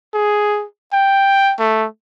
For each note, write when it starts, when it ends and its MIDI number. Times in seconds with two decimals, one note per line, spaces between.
0.14 0.65 68
0.93 1.54 79
1.59 1.86 57